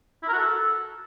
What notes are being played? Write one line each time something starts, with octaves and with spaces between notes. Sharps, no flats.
E4
A#4
F#4
A4